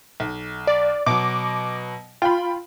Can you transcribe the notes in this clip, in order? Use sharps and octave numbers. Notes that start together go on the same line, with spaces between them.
B1
D5
B2 F#3 D6
F4 G5 B5